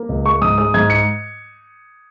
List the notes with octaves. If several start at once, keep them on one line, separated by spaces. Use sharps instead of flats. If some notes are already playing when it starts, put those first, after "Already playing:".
Already playing: A#3
C#2
G#3 C#6
G#2 D#6
G#3 D#6
G#2 G#6
C#7